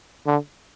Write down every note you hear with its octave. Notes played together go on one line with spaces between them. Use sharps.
D3